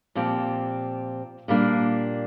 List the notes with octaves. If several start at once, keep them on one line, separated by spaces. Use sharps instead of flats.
A#2 F3 C4 G4
A#2 G3 A#3 D4